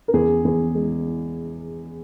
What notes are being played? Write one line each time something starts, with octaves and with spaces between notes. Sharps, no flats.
A#4
E2 G#4
E2
G#3